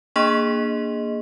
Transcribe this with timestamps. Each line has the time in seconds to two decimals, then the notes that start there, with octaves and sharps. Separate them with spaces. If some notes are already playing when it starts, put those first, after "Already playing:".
0.16 A#3 D4 G#4 D#5 C6